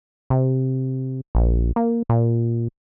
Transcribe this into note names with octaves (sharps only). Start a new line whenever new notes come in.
C3
A#1
A#3
A#2